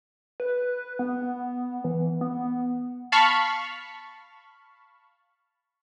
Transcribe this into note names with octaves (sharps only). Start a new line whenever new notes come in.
B4
B3
E3
B3
F5 A5 B5 C#6